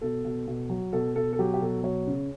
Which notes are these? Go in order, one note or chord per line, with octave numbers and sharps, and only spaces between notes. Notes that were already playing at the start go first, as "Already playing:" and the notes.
B2 A4
B2
B2
F#3
B2 A4
B2 A4
A4
F#3 G4
G4
B2 A4
F#3 C#5
C#3